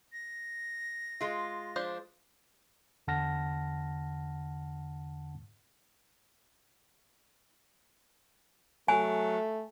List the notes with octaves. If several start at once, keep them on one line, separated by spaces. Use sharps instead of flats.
A#6
G#3 F4
F3 D4 C5
E2 D3 F#5 A5 F6 A#6
F#3 A3 G#5